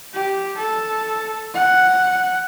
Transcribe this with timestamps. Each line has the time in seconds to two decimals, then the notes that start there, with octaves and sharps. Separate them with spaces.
0.14 G4
0.57 A4
1.54 F#5